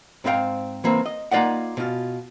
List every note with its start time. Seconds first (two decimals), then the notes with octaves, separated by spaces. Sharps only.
0.24 G#2 C4 E4 B4 F5 G5
0.84 E3 A#3 C4
1.06 D#5
1.31 A#3 D#4 F4 D5 D#5 F#5
1.77 B2 F4